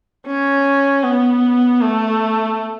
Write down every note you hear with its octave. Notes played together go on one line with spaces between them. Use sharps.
C#4
B3
A3